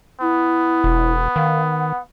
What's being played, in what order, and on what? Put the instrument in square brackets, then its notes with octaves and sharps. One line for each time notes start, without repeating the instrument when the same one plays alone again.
[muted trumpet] B3 [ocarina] E4
[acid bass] E1
[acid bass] D#3 [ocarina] F5
[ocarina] F#5